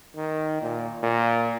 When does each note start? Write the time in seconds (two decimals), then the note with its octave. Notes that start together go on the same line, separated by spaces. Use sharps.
0.16 D#3
0.62 A#2
1.03 A#2